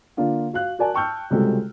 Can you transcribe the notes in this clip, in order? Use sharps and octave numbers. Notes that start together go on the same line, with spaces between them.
D3 A#3 D4 F4
F#4 F5 F#6
F#4 A#4 D5 G#5 A5
G5 A5 C#6 E6 F6 G6
C#2 C3 G3 G#3 F#4 A4